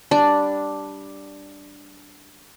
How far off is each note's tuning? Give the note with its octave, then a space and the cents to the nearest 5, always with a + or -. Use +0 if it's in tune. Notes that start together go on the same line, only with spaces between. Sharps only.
G3 +0 D4 +0